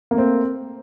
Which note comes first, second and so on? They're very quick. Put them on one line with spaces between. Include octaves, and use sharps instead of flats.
A#3 A3 C4